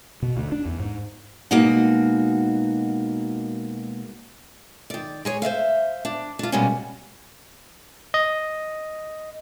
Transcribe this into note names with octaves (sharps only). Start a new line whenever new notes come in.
B2
D2
D4
E2
G#2
B2 G#3 A#3 D#4 F#4 F#5
D#3 D5
G#3 G#4 C#5
C5 D5 E5 F5
D4
D4 F4
B2 G3 G#3 A#3 B3 C#4
D#5